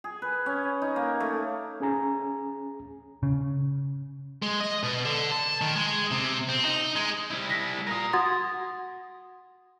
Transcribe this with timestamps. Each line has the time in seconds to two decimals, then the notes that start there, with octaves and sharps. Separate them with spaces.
0.04 G#4
0.22 B4
0.46 C#4
0.82 D#4
0.96 A#3
1.20 A3
1.80 C#4 G#4 G#5 A#5
3.23 C#3
4.42 G#3
4.60 D#5
4.83 B2
5.05 D3
5.32 A5
5.61 D#3
5.75 G#3
6.11 C3
6.49 C4
6.65 D#4
6.96 G#3
7.31 G3 E4
7.50 A#6 B6
7.87 F4 A#4 D#6 A#6
8.13 F#4 F#5 C6 D#6 G#6 A6